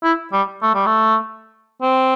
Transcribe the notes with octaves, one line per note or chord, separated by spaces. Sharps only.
E4
G3
A3
G3
A3
C4